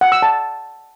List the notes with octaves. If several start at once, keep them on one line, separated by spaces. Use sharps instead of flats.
F#5
E6
A5